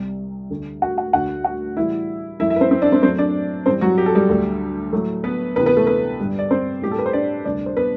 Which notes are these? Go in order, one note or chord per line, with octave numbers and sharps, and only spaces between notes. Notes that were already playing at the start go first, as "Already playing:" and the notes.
Already playing: C2 C3 G3
D2 D3 A3
F#4 F#5
F#4 F#5
D2 D3 A3 F#4 F#5
F#4 F#5
A2 E3 G3 E4 E5
F#2 E3 A3 E4 E5
E4 E5
B4
C4 C5
C4 C5
D4 D5
C4 C5
F#2 F#3 A3 C4 C5
D4 D5
G2 E3 G3 C4 C5
F#3 F#4
G4
A4
G3 G4
D2 D3 A3
A2 F#3 A3
B3 B4
D2 C3 E3 B3 B4
B3 B4
A3 A4
B3 B4
G2 D3 G3
D5
C4 C5
A2 G3 G4
A4
B4
C5
D4 D5
D2 C3 G3 D4 D5
C5
B3 B4